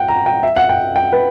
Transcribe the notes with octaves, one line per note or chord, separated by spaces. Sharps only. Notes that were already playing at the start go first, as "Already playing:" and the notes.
Already playing: F#5 G5
A#5
G5
E5
F#5
G5
G5
B4